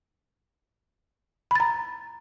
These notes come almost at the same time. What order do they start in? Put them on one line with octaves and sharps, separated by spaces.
B5 A6 A#5